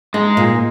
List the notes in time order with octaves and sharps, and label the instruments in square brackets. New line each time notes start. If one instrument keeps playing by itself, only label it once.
[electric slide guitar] G#3 [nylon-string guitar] D#4
[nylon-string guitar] A#2